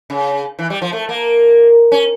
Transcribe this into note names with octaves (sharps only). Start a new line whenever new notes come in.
C#3
E3
G3
F3
A3
A#3
C#4